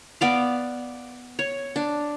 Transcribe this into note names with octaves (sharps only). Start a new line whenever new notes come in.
B3 D5 F5
C#5
D4